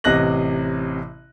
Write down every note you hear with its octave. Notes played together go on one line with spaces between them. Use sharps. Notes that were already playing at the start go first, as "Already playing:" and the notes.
A1 C3 D#5 F#6 A#6 F#7